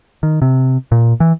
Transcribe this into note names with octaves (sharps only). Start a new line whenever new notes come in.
D#3
C3
A#2
E3